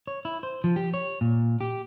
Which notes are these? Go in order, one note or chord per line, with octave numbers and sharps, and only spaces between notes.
C#5
E4
C5
F3
G4
C#5
A#2
G4